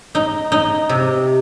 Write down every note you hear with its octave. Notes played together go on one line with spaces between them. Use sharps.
D#4
D#4
C3